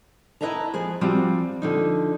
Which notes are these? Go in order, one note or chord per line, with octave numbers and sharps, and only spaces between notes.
E4 B4 D#5 E5 A5 A#5
F3 G#4 B4
F3 G3 C4 F4 F#4
D3 F3 D#4